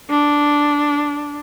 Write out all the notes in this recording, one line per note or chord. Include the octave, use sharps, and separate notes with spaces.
D4